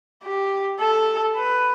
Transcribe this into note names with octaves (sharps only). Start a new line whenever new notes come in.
G4
A4
B4